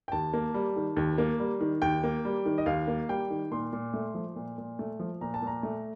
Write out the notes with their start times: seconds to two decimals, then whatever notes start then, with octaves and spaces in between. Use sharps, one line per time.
0.08 G5
0.12 D#2 A5
0.34 A#3
0.54 G3
0.76 D#3
0.97 D#2
1.18 A#3
1.39 G3
1.61 D#3
1.82 D#2 G5
2.04 A#3
2.25 G3
2.46 D#3
2.58 D#5
2.66 D#2 F5
2.88 A#3
3.09 G3 G5
3.30 D#3
3.51 A#2 C6
3.73 A#2
3.94 A3
4.14 F3
4.36 A#2
4.58 A#2
4.79 A3
5.00 F3
5.21 A#2 A#5
5.34 A5
5.42 A#2 A#5
5.63 A3